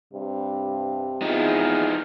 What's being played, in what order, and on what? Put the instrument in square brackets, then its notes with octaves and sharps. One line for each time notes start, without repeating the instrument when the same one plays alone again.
[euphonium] G2 [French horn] C3
[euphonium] E2 [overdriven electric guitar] F3 D#4